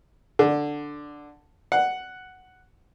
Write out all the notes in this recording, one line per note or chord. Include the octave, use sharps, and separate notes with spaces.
D3
F#5